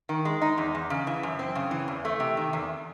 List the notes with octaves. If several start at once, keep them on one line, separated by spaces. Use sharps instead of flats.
D#3
G#3
D#4
E2
E2
C#3
E3
F#2
C4
C#3
E3
E2
A3
C3
D#3
E2